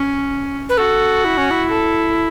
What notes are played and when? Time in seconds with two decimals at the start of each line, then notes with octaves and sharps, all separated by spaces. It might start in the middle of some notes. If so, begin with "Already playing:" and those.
Already playing: C#4
0.69 B4
0.77 F#4 A4
1.24 E4
1.37 C#4
1.51 E4
1.70 A4